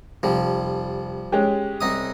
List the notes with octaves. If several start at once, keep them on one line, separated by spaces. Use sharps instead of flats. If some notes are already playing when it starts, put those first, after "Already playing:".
F1 F3 G3
G#3 C#4 G4
C2 D#4 D#6